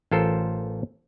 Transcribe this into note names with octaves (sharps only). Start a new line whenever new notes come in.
A1 F4 A4 A#4 C5